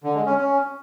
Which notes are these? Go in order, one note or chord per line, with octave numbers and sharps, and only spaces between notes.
D3
G#3
C#4
C#4